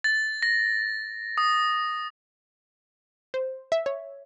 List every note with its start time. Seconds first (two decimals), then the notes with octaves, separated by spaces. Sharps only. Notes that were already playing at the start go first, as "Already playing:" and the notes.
0.04 A6
0.43 A#6
1.38 D#6
3.34 C5
3.72 E5
3.86 C#5